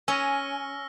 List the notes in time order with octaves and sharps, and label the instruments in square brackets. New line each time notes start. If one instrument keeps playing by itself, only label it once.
[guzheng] C#4 [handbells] G#5 [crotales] E6 F6 A#6